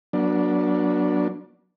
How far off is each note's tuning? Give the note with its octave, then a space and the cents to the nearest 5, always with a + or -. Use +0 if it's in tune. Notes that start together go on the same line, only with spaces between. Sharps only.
F#3 +0 B3 -45 D4 +0